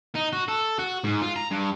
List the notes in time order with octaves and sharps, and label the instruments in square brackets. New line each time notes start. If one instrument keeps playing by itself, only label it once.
[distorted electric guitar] D#4
F#4
A4
F#4
G#2
F4
A#5
G2